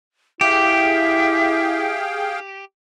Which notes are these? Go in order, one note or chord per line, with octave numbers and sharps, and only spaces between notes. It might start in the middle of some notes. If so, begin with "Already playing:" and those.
E4 G4 G#4 E5 F5 G5